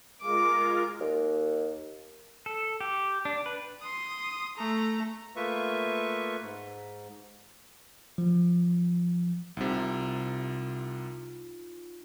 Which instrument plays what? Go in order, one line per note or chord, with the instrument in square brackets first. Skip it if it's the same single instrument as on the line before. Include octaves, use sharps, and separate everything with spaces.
[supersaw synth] G#3 F4 A#4 [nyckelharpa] D6
[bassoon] D#2
[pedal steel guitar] A4
G4
D4
B4
[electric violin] C6 D#6
A3 A#5
[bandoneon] A3 A#3 F4 B4 E5 C#6
G#2
[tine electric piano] F3
[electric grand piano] C2 C3 [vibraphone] D#4 F4